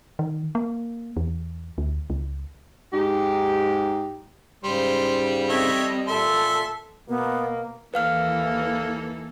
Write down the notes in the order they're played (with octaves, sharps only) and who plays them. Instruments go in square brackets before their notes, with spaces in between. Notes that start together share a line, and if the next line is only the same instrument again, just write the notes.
[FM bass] D#3
A#3
E2
D2
C#2
[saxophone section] G#2 D#4 G4
[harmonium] G#2 C#3 [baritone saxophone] G3 [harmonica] C5
[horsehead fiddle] C4 D#5 [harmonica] A4 C#5 E5
[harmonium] A#2 [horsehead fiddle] A4 [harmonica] E5 C6
[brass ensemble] B2 A#3 [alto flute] B3
[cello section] D#2 E3 [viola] A#3 A4 [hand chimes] B4 F5 F6